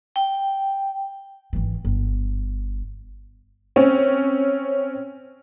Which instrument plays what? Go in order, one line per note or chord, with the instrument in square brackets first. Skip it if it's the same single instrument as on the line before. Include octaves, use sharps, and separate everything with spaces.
[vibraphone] G5
[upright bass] G#1 E3
G1
[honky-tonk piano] C4 C#4